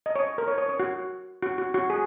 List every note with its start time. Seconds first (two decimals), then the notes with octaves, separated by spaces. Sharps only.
0.06 D#5
0.16 C#5
0.38 A#4
0.48 C#5
0.58 C#5
0.69 C#5
0.80 F#4
1.43 F#4
1.58 F#4
1.74 F#4
1.90 G#4